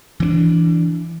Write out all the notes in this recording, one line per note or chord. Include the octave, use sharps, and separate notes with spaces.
E3 C4 D4